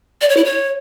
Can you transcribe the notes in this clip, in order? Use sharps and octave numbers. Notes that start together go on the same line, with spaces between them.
D5
C#5
E4
C#5